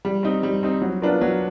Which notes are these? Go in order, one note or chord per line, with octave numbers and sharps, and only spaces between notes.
G3
C4 D#4
G3
C4 D#4
F#3
B3 D4 F4 A#4
F#3